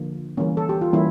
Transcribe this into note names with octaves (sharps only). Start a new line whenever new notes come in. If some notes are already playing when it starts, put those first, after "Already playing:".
Already playing: D3 F3 A#3
E3 G3 A#3 C#4
A4
G4
F4
E3 G3 A#3 C#4 E4